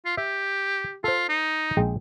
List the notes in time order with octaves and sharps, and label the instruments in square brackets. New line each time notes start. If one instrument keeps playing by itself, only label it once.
[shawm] F4
[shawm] G4 [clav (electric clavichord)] E5
[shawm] F4 [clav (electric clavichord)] A4 C5
[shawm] D#4
[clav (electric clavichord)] A#1 G#3 G5